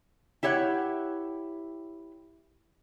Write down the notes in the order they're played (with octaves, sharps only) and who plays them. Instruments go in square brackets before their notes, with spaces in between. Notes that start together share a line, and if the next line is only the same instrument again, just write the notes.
[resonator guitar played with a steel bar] E4 G4 C#5 E5 F#5